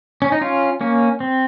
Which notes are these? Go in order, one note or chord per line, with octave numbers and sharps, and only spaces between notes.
C#4
D#4
C#4 F4
A#3 C#4
C4